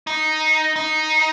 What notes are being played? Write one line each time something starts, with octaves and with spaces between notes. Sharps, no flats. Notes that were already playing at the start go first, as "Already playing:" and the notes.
D#4
D#4